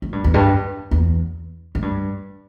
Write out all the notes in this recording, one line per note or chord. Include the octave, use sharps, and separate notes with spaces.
A2
G2
E2
G2
E2
A2
G2